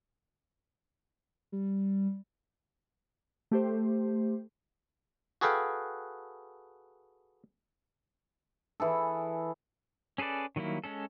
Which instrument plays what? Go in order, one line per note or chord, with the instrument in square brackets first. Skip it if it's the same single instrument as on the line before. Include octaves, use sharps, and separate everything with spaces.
[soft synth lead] G3
[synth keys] A3 G4 C5
[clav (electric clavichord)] F#4 G#4 A4 B4 F5 G5
[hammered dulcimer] E3 G#4 A4
[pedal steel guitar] C#4 G#4 A4 B4 D5
D#3 F#3 G3 A#3 E4
G#3 C#4 A4